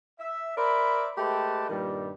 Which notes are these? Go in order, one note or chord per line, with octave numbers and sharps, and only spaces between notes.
E5
A#4 C5 D5 E5 B5
G#3 A3 G4 B4 G5 A5
G2 A#2 D#3 G3